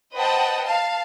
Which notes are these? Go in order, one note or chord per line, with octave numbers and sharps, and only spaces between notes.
B4 C5 D#5 F#5 G5 A5
F5 A5